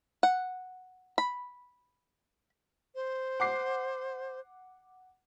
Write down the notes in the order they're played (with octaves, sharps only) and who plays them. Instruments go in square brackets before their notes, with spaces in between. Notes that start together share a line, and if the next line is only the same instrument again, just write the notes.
[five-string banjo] F#5
B5
[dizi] C5
[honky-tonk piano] F#5 D6 C7